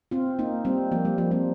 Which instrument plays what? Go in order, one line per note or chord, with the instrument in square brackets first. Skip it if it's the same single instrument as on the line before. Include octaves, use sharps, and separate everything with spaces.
[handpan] C4 F4
A#3 D#4
G3 C4
F3 A#3
G3
F3 A#3
G3 C4